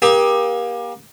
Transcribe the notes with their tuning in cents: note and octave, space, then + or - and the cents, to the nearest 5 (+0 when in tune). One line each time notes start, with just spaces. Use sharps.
A#3 +30 G4 +20 D#6 +35